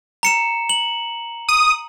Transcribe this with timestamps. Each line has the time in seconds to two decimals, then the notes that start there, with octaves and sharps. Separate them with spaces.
0.23 A#5 C#7 E7
0.69 F#7
1.48 D#6